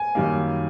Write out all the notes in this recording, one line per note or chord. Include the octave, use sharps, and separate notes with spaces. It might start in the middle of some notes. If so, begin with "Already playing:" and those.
Already playing: G#5
F#2 D#3 G3 A#3